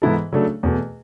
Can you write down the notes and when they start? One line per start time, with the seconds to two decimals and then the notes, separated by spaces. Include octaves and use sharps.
0.02 G#2 E3 B3 E4 A4
0.32 C#3 F#3 A3 D4 A4
0.63 E2 B2 A3